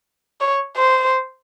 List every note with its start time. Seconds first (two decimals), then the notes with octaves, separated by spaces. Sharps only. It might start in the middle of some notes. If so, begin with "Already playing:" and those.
0.41 C#5
0.77 C5